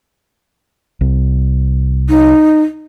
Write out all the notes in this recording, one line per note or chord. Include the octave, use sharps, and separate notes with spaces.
C2
D#4